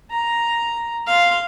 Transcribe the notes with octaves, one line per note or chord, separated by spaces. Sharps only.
A#5
F5 C6